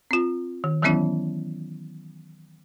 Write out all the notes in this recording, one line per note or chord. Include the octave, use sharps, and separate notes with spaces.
C4 F4
D#3
D#3 E3 F#3 B3 C#4 E4